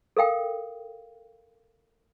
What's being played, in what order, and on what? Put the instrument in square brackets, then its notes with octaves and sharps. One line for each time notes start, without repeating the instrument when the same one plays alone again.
[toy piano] A4 A#4 F5 G5